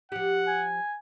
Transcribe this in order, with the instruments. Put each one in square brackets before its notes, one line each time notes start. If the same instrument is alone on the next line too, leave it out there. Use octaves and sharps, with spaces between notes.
[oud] F3 G4 [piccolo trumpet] F#5
[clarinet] G#5